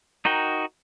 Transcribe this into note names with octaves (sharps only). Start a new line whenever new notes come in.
D#4 F#4 A#4 G5